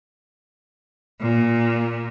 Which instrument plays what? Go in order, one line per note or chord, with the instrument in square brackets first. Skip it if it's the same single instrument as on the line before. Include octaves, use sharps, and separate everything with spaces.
[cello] A#2